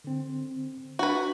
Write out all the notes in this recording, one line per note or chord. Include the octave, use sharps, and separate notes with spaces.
D3 C4
D4 F#4 B4